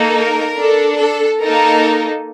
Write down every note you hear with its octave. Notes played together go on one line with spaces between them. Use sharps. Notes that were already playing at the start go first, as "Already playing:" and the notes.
Already playing: A#3 D#4 A4
A#4
D4 A4
A4
A#3 D#4 A4 A#4